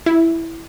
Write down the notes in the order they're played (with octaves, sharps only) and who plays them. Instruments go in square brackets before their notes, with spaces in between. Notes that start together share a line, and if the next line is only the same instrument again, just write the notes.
[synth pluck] E4